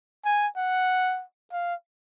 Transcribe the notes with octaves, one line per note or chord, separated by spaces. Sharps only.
G#5
F#5
F5